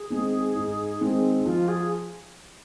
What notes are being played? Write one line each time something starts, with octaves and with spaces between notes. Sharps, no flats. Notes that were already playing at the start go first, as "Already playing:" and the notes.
Already playing: G#4
D#3 G#3 C4
G#2
D#3 G#3 C4
F3 F4
G#4